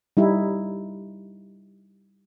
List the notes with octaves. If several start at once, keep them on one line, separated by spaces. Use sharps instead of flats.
G3 D#4 E4